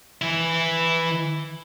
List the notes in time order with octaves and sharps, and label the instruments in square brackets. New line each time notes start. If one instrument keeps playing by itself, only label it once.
[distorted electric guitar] E3 E4